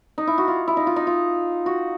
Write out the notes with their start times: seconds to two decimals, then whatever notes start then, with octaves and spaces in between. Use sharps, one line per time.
0.18 D#4
0.27 E4
0.38 F#4
0.48 F4
0.68 E4
0.77 D#4
0.87 F4
0.96 D#4
1.07 F4
1.66 F#4